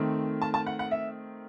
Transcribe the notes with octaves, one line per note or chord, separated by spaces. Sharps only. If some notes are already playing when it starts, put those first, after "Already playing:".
Already playing: D#3 A3 C4
A5
A5
F#5
F#5
E5